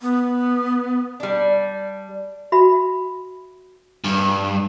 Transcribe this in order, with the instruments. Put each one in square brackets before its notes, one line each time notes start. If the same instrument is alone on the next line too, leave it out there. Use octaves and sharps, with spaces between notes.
[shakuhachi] B3
[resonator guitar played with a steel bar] G3 D4
[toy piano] F#4 E5 B5
[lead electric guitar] G2